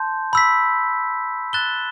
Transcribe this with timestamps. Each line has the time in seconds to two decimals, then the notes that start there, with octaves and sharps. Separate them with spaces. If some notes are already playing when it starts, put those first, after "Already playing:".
Already playing: A5 C6 G6
0.33 B5 E6 B6
1.53 F#6 A6 E7 G7